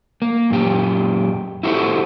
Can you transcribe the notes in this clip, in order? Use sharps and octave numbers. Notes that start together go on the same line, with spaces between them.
A#3
F#2 A#2 G4
E4 F#4 G4 A4 C5